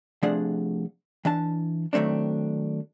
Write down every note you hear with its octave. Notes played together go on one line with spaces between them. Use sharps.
C3 F3 A3 D4 G#4 F#5
E3 D4 A5
D#3 F#3 A3 C4 D4